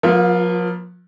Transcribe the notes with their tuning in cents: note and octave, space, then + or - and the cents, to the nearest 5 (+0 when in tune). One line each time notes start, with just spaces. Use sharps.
F3 +40 A#3 +45 F4 +0